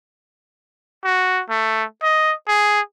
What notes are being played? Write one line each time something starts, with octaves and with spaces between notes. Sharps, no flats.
F#4
A3
D#5
G#4